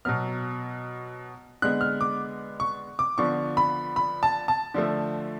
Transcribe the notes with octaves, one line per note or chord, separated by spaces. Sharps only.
B2 F#3 B3 F6
D3 G#3 B3 F#6
F6
D6
C#6
D6
D3 F3 B3 C#6
B5
B5
A5
A5
D3 F3 A3